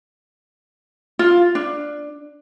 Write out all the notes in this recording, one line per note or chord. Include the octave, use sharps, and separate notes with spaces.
F4
D4